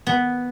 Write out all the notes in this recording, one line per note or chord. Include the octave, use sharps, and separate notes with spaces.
B3